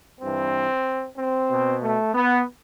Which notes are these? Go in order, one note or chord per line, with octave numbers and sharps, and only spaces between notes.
G2 E3 C4
C4
B2
A3
B3